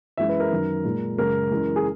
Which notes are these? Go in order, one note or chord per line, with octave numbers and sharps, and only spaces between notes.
F#2 E3 G#3 E5
B4
A#4
F#2 D#3 F#3
A#2 G#3
F#2 C#3 G#3 A#4
F#2 E3 G#3
G#4